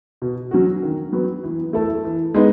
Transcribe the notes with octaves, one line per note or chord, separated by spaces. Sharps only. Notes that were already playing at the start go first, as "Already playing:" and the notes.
B2
F#3 C#4 F#4
D#3
F#3 B3
E3
A3 E4 A4
E3
G#3 B3 D#4